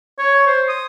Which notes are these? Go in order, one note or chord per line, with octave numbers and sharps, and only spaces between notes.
C#5
C5
D#6